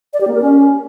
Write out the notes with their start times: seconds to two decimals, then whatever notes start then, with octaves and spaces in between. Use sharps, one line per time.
0.13 D5
0.21 G4
0.28 A#3
0.35 A#4
0.42 C#4